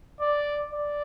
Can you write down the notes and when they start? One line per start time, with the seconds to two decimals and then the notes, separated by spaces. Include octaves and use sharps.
0.21 D5
0.73 D5